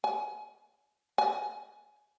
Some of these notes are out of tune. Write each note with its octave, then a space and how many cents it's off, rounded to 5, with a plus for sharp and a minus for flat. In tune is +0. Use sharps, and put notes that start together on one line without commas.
G#5 +25
G#5 +15